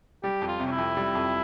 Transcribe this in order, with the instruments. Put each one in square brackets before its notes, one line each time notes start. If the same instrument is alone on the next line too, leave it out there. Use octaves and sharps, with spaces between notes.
[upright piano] G3 [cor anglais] G4
[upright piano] F2
[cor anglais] F4
[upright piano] C3
[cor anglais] C#4
E4
[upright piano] F2
G3
F2